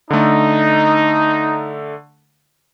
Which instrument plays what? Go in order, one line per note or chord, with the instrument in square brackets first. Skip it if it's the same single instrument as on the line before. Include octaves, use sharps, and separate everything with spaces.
[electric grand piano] D3 A3 [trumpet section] D#4